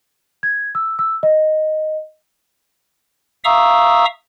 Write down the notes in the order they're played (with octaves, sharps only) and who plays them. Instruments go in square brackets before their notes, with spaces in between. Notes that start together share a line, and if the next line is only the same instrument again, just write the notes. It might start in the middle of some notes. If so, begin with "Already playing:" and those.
[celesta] G#6
E6
E6
D#5
[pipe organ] E5 F5 A#5 C#6 D#6 E6